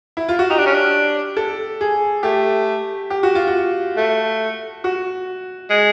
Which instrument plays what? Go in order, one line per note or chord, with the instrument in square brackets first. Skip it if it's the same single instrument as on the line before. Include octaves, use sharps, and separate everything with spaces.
[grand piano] E4
F4
F#4
[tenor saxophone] D#4 [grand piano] G4
[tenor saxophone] D4
C#4
D4
[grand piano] A4
G#4
[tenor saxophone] A3 [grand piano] G4
[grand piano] G4
F#4
F4
F#4
[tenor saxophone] A3
[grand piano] F#4
[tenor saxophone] G#3